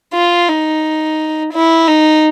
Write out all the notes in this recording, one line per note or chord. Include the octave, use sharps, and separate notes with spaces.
F4
D#4
E4
D#4